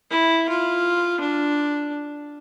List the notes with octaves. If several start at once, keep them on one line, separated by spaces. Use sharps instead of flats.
E4
F4
D4